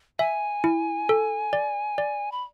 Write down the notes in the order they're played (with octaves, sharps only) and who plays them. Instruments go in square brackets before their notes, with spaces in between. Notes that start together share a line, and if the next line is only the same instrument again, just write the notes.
[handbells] E5 [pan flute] G#5
[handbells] E4
A4
D5
D5
[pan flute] B5